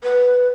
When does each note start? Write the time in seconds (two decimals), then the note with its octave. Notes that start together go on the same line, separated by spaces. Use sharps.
0.03 B4